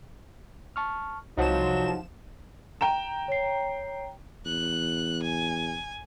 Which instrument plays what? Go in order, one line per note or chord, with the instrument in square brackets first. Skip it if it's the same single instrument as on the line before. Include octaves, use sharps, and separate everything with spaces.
[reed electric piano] A5 C#6 F6
[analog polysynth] C2 F3 E7 [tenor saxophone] F#3 [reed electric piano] D#4 F#5 A5
[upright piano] G5 A#5 E7
[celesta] C#5 C7
[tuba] E2 [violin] F#6
[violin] G#5